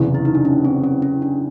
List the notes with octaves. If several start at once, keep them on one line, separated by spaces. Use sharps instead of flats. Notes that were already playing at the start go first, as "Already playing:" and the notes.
Already playing: F#1 E2 C3
E4
D#4
D4
C#4
C4
C#4
C#4
D4